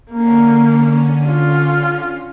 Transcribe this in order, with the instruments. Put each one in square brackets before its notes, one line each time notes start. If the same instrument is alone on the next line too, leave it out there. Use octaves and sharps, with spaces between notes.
[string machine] D3 C#4 [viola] A#3
[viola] F4